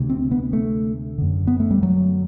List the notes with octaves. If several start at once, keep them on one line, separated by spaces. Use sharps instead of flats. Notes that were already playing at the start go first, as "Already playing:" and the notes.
Already playing: D2 C3
C4
B3
A3
F#2 D3
B3
A3
G3
F#3